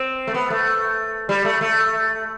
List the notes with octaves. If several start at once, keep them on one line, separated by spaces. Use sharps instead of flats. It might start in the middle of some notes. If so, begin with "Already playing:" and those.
Already playing: C4
A3
B3
A3
G3
A3
A3